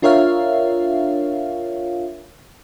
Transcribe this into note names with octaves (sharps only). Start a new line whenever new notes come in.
D4 F4 A#4 C#5 E5 F5